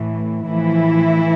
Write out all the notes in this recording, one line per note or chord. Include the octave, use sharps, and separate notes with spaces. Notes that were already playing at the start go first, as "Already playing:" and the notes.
Already playing: A2 E3
A2 E3 F3 E4